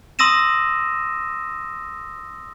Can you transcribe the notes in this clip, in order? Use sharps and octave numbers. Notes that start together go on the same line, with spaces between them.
C6 D#6 E6 A#6 D#7 E7